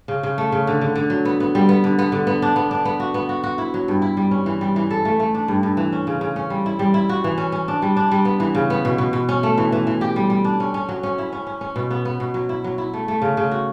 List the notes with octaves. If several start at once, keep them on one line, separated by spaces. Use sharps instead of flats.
C#3
C#3
A3
C#3
D3
D3
D3
F#3
B3
B3
G3
B3
D3
B3
D3
B3
D4
B3
D4
B3
F#4
B3
F#4
F#4
E4
F#3
G2
E4
G3
C#4
E3
G3
E3
A4
A3
A3
D4
G2
G2
E3
C#4
C#3
C#3
C#4
G3
E4
G3
E4
F#4
E3
C#4
C#4
D4
G3
D4
G3
B3
E3
C#3
B3
B2
B2
B2
C#4
A3
E3
E3
E3
G4
G3
G3
D4
C#4
C#4
F#3
C#4
E4
C#4
C#4
C#4
B2
B3
B3
B2
F#3
E4
F#3
E4
A3
A3
C#3
C#3
F#4